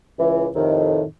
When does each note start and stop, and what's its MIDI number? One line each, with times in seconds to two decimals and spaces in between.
0.19 0.47 37
0.19 0.47 52
0.56 1.02 41
0.56 1.02 45
0.56 1.02 48
0.56 1.02 51